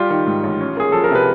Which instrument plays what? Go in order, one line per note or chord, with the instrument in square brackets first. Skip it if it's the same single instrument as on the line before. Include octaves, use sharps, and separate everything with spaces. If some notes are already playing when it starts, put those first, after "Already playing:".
Already playing: [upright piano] G3 [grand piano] F4 G4
[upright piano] D#3
G#2
A1
C#4
[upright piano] A#3 [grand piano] G#4
[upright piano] F3 [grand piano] A4
[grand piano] A#4
[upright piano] C3 [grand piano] B4